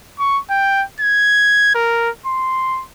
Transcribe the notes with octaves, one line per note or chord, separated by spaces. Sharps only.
C#6
G5
G#6
A#4
C6